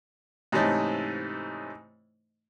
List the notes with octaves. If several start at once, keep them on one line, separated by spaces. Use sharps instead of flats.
G#2 C3 E3 A3 C#4 D#4